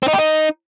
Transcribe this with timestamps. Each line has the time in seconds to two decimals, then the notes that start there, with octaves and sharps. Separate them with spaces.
0.03 C4
0.08 D#4
0.13 G4
0.19 D#4